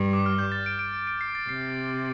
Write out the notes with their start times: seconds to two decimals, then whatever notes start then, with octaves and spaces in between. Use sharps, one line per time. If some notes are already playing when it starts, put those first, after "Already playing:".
Already playing: G2
0.13 D6
0.26 F6
0.39 G6
0.52 A6
0.66 D7
0.79 D7
0.94 D7
1.07 D7
1.21 C7
1.35 A6
1.48 C3 C7